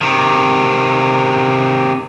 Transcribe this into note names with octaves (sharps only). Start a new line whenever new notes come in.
C3 D#3